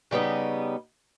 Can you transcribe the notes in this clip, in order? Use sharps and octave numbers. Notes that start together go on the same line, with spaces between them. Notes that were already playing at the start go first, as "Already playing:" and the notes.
C#3 G3 B3 D#4